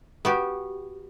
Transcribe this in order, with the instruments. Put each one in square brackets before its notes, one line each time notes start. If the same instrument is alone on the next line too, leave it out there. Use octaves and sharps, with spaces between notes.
[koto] B3 F#4 G4